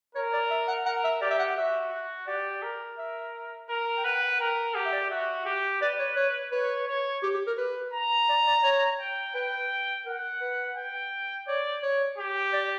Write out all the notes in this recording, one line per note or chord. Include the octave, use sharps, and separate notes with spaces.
A#4 C#5
D5
E5
F#5
A#4 F#5
E5
G4 D5
E5
F#5
F#4 E5
F#4
G4 D5
A#4
E5
A#4
G5
B4 F#5
G5
F#5
A#4 G5
G4 F#5
E5
D5
F#4 E5
G4
B4 D5
C#5
C#5
B4 C#5
C#5
G4
G4
A#4
B4
A#5
D5
D5
C#5
G5
B4 G5
A#4 F#5
B4
G5
C#5 D5
C#5
G4
D5